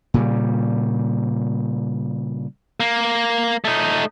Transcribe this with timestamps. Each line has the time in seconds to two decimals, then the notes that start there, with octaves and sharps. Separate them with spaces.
0.14 A#2 C#3 G3
2.80 A#3
3.65 A3 D#4